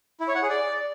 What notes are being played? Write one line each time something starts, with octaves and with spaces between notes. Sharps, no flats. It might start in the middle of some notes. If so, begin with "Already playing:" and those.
E4
C#5
F#5
G#4
D5